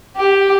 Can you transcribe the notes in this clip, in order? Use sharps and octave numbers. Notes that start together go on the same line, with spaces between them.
G4